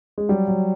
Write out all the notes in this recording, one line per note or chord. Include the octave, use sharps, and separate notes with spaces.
G#3
F#3 G3
F#3